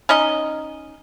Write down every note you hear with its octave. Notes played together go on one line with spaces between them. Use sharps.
C#4 D#4 D#5